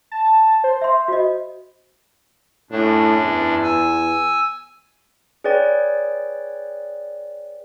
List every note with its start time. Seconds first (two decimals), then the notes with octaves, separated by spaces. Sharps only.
0.12 A5
0.64 C5
0.82 E5 C6
1.08 F#4 D#5
2.71 F#2 A2 D4
3.24 E2
3.63 G#5 E6
5.44 G#4 B4 C#5 D5 G5